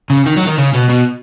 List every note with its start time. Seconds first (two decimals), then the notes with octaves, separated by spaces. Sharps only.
0.10 C#3
0.26 D#3
0.37 F#3
0.47 D#3
0.58 C#3
0.74 B2
0.89 B2